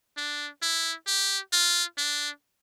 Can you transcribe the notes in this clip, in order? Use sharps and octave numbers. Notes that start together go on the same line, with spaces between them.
D4
E4
G4
F4
D4